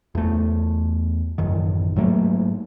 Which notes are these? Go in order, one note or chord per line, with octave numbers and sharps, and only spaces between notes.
E2 A3
A1 F#2 D#3
G#2 F#3 A3 A#3